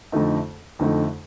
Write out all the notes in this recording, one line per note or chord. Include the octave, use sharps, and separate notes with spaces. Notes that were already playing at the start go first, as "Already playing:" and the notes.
F2 D3 A3 D#4
F2 D3 A3 D#4